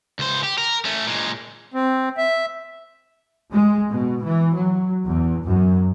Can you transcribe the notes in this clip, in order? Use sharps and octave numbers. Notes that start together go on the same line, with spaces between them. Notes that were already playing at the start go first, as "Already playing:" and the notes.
C#2 C5
G4
A#4
A3 C#4
A#2 G#3
C4
E5
G#3
B2
E3
F#3
E2
F#2